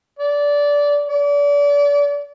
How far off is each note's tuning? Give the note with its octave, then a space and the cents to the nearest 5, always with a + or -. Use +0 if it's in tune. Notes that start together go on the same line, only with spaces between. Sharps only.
D5 -20
D5 -35